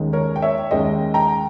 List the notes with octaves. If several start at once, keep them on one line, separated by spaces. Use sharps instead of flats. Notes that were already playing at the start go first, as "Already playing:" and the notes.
Already playing: D#2 D#3 G#3 C#4
A#4 C#5
G5
C#5 E5
D#2 D#3 G#3 C#4 D#5 G5
G5 A#5